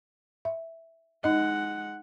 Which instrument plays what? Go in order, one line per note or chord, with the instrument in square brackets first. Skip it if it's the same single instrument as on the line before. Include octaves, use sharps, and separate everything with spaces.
[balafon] E5
[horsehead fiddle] G#3 F#5 [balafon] D#4 D#5